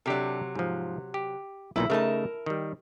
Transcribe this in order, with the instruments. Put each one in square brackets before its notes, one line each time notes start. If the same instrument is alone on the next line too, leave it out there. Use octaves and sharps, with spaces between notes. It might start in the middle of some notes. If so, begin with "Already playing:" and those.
[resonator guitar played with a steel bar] C3 F#3 [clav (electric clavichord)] D4 G4 A4
[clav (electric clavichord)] G#2 F3
G4
[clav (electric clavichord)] B1 A#2 D#4 [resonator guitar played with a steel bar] E4
[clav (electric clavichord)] C#3 A3 D#4 [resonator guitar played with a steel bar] A#4 A5
[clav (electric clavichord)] D#3 G3